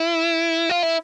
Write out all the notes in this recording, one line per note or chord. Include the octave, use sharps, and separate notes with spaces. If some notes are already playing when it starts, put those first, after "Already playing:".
Already playing: E4
F4
E4